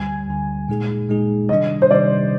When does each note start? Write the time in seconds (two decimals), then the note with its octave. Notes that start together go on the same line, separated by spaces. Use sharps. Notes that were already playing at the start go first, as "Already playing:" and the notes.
Already playing: D2 D3 G3 G#5
0.28 D2 D3 G3
0.68 A#2 G#3 D#4 G#4
1.09 A#2 G#3 D#4 G#4
1.49 C3 D#3 G3 D4 D#5
1.82 C5
1.90 C3 D#3 G3 D4 D5